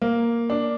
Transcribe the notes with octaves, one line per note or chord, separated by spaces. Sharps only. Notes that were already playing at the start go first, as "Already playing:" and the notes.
A#3
D4